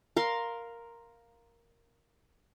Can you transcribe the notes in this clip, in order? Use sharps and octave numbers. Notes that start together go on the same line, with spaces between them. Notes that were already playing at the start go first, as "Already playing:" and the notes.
A#4 F5 C6